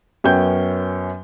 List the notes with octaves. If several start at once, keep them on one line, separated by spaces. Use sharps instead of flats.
F#2 B3 C#4 G5 G6